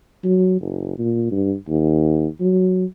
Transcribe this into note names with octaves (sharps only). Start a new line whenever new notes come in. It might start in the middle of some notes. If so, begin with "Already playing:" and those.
F#3
F#1
A#2
G2
D#2
F#3